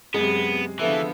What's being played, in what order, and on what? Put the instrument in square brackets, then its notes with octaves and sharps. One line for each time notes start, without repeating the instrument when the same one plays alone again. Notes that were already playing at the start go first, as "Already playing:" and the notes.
[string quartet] F#2 C3 [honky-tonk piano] G#3 [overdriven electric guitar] B3
[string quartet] D3 F3 B3 [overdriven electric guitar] E3 [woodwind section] A4 E5